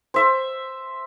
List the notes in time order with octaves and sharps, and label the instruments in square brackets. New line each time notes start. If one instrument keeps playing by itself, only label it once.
[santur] C5 E5